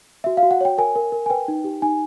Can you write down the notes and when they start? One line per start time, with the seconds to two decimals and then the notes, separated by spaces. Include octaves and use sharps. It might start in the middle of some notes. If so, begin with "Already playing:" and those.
0.24 F#4 E5
0.37 F5
0.43 F#4
0.51 F#5
0.61 C#5 G5
0.78 A#4 G#5
0.96 A#4
1.12 A#4
1.26 G#5
1.30 B4 G5
1.48 D#4
1.64 G4
1.82 D#4 G#5